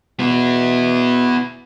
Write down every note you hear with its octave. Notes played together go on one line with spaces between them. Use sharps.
B2 B3 E4